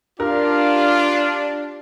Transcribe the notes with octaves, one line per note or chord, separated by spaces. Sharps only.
D4 F4 G4 A#4 F5